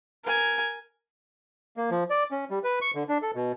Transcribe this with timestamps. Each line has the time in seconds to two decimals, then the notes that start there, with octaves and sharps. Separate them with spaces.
0.24 A#4 G#5
1.77 A#3
1.91 F3
2.10 D5
2.31 C#4
2.50 G3
2.64 B4
2.81 C#6
2.95 D3
3.09 D4
3.22 A4
3.35 B2